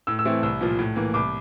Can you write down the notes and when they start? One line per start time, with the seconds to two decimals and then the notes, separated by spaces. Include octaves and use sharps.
0.07 A2 E6
0.19 E6
0.25 E3 A3 C4 E4
0.43 C2 E6
0.61 A#2 F3
0.79 A2
0.96 E3 A#3
1.14 C2 D6